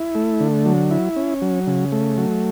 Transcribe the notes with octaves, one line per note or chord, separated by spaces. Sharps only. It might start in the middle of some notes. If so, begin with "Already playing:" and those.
Already playing: E4
A3
D3
F#3
E4
C#4
F#3
C#3
A3
F#3